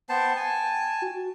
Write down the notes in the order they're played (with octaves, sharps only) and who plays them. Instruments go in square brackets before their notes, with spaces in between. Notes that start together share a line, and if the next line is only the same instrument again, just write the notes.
[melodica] B3 C5 A5 [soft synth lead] G5
[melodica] G#5 A5
[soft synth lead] F#4